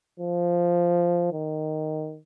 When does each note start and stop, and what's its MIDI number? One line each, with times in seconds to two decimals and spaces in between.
0.20 1.30 53
1.33 2.18 51